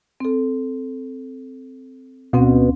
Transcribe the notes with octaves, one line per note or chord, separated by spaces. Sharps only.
C4 A4
D2 B2 C4 C#4